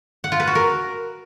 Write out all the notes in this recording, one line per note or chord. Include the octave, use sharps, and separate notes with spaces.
F#5
F4
B4
F#4
A#4